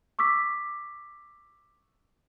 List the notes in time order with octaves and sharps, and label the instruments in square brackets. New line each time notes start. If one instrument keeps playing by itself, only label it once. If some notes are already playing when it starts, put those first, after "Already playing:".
[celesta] C#6 D6 E6 B6